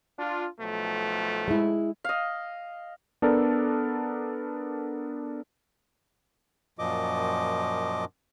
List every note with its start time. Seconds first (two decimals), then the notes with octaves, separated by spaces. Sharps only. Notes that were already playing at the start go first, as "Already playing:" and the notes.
0.19 D4 F4
0.58 B1 F3 A3
1.48 G#3 E4
2.04 D#5 F5
3.22 B3 D4 A4 A#4 D5
6.79 F#2 A#2 F3 D#5 D6